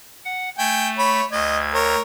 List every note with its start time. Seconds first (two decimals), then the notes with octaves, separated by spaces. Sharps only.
0.25 F#5
0.58 A3 G5 G#5
0.98 C#5 B5
1.32 D2 D#5 G#6
1.74 A#4 C#5